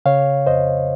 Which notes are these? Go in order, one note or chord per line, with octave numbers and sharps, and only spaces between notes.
C#3 C#5 F5
F2 C5 D#5